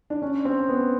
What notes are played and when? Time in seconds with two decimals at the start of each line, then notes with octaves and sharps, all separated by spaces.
0.10 D4
0.22 C#4
0.45 C4
0.69 B3